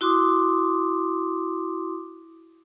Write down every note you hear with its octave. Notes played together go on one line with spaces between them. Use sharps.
E4 F#4 C6 D6 D#6